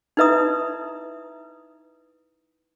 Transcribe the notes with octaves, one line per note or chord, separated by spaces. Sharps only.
D#4 E4 B4 E5 A#5 D#6